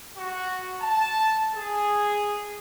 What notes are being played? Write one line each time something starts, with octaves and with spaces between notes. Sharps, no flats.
F#4
A5
G#4